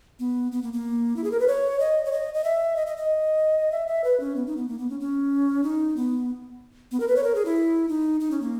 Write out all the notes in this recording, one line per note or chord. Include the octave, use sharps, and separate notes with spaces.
B3
B3
A#3
A#3
E4
G#4
A#4
B4
C#5
D#5
C#5
D#5
D#5
E5
D#5
D#5
D#5
E5
E5
B4
C#4
B3
D#4
B3
A#3
B3
C#4
C#4
D#4
B3
B3
A#4
B4
C#5
A#4
G#4
E4
D#4
D#4
C#4
A#3